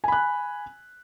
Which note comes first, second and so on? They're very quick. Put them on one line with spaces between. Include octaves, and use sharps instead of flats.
G#5 B5 F#6